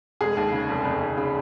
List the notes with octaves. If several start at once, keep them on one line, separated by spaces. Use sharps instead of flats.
F1 G#3 G#4
D#2
C#3
F1
F1
D#2
C#3